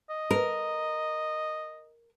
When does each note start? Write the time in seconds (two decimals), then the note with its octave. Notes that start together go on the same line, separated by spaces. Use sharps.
0.10 D#5
0.31 A#4